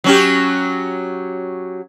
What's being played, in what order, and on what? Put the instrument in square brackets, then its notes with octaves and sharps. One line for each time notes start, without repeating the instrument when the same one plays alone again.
[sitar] F#3 C#4 G4